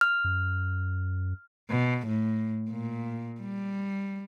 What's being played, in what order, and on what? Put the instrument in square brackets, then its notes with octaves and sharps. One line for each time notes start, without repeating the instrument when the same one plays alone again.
[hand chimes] F6
[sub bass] F#2
[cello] B2
A2
A#2
G3